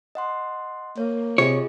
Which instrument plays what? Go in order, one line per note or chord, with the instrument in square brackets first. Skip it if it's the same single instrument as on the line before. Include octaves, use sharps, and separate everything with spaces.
[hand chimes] D#5 F#5 C6
[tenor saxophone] A#3 [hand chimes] C#5
[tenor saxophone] C3 [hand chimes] F4 G#4 D#5 [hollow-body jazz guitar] C#5